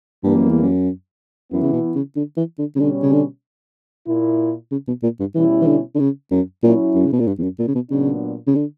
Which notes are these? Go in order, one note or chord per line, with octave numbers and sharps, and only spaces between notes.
G2 E3 G3 A#3
F#2
E2
F#2
F#2 E3 B3 E4
C#3
B2
C#3
D3
E3
D3
C#3
B2 D3 G3 C#4
C#3
D3
A#2 A#3 E4
C#3
B2
A#2
G2
B2 E3 G3 C#4 E4
E3
D3
D3
C#3
F#2
A#2 F#3 C#4 E4
F#2
C#3
B2
A#2
G2
E2
F#2
A#2
C#3
B2
A#2 C#3 F#3 B3 D4
C#3
D3